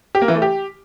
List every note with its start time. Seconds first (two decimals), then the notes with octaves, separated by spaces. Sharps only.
0.15 G4
0.21 A#3
0.28 E3
0.35 A3
0.42 G4